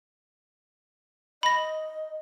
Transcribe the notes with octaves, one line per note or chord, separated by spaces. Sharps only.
D#5 B5 A#6